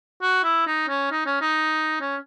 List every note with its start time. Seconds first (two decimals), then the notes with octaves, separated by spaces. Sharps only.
0.22 F#4
0.44 E4
0.67 D#4
0.88 C#4
1.11 D#4
1.26 C#4
1.41 D#4
2.01 C#4